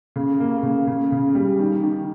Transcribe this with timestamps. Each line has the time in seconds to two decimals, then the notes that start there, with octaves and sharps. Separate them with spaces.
0.16 C#3
0.40 A#3
0.63 C#3
0.87 C#3
1.12 C#3
1.35 G3
1.59 D#3
1.83 D#3